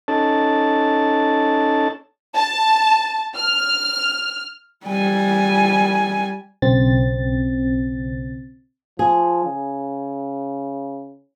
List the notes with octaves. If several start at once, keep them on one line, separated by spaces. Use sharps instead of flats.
C#4 D#4 A4 A5
A5
F6
G3 G#5
B1 C#3 C4 A6
F3 G#4
C#3